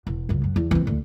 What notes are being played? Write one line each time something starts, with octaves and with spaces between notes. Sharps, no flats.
E1
C#2 F#2
F#2
E2
E3 C4
D2